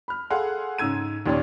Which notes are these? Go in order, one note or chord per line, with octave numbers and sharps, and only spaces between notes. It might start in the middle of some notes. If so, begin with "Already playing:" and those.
B5 F6
G#4 A4 F5 F#5 C6
G#2 C#3 E6 G#6 D#7
D#2 A#2 C#4 C#5 D5